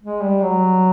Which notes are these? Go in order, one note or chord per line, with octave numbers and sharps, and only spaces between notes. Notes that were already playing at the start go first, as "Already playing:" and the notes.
G#3
G3
F#3